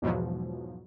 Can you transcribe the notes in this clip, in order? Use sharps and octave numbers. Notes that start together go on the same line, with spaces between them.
E2 G#2 B2 F3 F#3